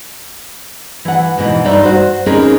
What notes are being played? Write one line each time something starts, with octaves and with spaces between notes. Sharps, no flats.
E3 F#5
G#2 B2 E3
G2 D#4 D5 E5
F#4 C5
C4 C#4 D#4 G#4 A#4 B4